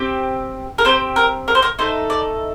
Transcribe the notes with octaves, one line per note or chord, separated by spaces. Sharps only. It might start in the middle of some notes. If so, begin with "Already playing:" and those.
Already playing: C4 G4
A#4
C4 G4 C5
A#4
A#4
C5
A#4
A3 D#4 A4 C5
D5